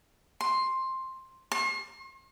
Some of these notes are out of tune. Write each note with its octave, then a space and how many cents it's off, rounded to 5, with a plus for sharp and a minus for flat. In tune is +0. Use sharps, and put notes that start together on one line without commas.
C6 +5
C6 +45